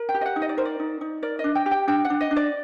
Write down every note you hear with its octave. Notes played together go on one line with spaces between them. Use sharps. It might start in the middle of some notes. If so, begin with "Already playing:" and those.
Already playing: A#4
G5
G4
D#5
F#5
D#4
D#5
D5
A#4 C5
D5
D#4
D#4
A#4 D5
D#5
D4
G5
G4
G5
D4 G5
F#5
D4
D#5
D4
D5